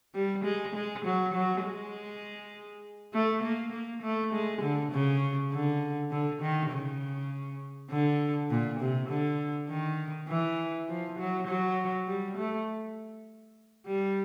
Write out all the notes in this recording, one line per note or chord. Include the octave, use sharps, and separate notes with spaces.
G3
G#3
G#3
F#3
F#3
G#3
A3
A#3
A#3
A3
G#3
D3
C#3
D3
D3
D#3
C#3
D3
A#2
C3
D3
D#3
E3
F3
F#3
F#3
G3
A3
G3